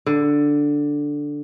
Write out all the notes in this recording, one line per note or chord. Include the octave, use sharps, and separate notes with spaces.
D3